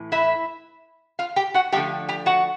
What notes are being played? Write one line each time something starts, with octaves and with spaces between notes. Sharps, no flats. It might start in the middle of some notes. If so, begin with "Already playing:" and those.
Already playing: A2 E3
E4 E5
F4 F5
G4 G5
F#4 F#5
D3 F3 A3 G4 G5
G4 G5
F#4 F#5